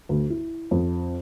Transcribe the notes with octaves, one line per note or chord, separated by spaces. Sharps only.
D2
E4
F2